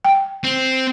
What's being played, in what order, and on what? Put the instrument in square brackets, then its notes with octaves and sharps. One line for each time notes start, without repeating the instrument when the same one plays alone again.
[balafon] G5
[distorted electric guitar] C4